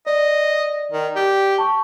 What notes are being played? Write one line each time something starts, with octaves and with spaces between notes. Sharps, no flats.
D5 D#5
D#3
G4
A5 C#6